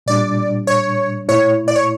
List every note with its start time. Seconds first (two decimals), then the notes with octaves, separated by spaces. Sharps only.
0.06 A#2 G3 D4 D5
0.67 C#5
1.28 A#2 A3 E4 C#5
1.68 D5
1.76 C#5